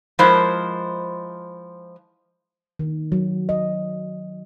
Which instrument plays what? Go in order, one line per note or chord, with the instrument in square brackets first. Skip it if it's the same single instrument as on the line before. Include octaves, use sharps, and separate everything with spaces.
[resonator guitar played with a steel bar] F3 G#3 E4 A#4 C5
[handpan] D#3
F#3
D#5